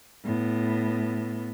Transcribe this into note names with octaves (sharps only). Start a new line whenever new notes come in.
A2 B3